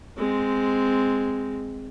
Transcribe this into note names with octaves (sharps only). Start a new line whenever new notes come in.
G#3 C4